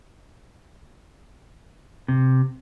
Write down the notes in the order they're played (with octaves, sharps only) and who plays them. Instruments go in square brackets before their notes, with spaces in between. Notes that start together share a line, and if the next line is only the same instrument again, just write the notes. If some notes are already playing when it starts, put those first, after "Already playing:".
[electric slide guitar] C3